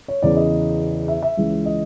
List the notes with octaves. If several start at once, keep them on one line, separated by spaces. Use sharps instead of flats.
C#5
E2 C#3 E3 D5
D#5
E5
E5
C#2 C#3 E3
D#5